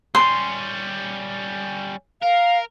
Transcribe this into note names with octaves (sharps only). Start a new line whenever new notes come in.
G3 C#4 C6
A#4 F5